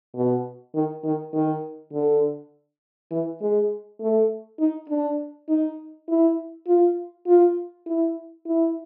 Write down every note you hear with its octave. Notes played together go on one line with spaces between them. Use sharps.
B2
D#3
D#3
D#3
D3
E3
G#3
A3
D#4
D4
D#4
E4
F4
F4
E4
E4